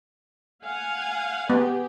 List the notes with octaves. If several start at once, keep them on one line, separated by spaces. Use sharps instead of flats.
F5 F#5 G#5
B3 G4 G#4